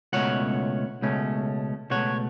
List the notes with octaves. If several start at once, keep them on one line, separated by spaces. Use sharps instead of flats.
C#2 B2 A3 C#4 C#5 F#5
C#2 B2 A3 C#4
C#2 B2 A3 C#5 F#5